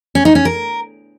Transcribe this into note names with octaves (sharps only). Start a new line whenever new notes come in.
C#4
D#4
C#4
A#4